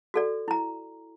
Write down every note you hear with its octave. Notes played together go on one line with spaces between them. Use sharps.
F#4 A4 D5
E4 A#5